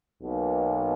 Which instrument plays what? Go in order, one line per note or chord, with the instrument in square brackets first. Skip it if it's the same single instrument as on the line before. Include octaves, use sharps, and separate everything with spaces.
[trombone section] B1 B2 A#3